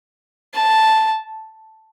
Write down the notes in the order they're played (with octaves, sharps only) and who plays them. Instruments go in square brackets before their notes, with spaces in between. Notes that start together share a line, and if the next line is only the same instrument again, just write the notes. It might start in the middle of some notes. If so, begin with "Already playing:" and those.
[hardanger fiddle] A5